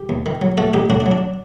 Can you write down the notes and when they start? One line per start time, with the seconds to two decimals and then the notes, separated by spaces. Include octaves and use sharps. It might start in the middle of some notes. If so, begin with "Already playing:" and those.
Already playing: G4
0.09 D#2
0.26 D#3
0.42 F#3
0.57 A3 F#4 A4
0.73 A1 D#4 G4
0.90 A2 D4 F#4
1.00 D4
1.06 F#3
1.11 D4